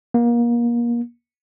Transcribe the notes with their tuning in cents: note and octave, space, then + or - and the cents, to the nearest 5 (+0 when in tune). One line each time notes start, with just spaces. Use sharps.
A#3 +30